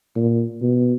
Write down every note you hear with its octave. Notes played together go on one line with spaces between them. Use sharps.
A#2
B2